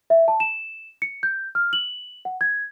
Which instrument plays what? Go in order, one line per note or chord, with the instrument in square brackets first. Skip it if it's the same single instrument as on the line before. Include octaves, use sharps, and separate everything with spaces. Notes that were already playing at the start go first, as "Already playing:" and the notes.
[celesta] E5
A5
E7
C#7
G6
F6
F#7
F#5
G#6